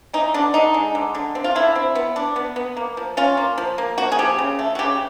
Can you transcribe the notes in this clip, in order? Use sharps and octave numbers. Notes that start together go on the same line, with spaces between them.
E3 D#4
D3 D4
D3 D#4
G#3
D3
D3
C4
F4
D3 E4
C4
B3
D4
B3
B3
A#3
F3
C#4 F4
A#3
F3
A#3
F3 F#4
G#4
F3 G4
C#3
A3
F#4
C#3 G4